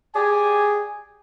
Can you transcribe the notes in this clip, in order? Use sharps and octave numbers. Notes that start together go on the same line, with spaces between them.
G4 G#4 D5 G#5